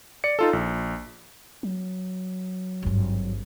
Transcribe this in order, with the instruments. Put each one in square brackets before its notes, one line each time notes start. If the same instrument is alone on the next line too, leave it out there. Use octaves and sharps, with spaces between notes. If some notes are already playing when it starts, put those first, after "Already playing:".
[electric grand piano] D5 C#7
D#4 F4 A4
A#1
[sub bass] F#3
[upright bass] G#1 G2